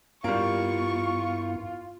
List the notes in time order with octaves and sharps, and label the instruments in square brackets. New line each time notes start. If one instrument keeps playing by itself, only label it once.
[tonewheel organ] G2 B3 E4 [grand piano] G3 A#3 [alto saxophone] F4 [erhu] C#6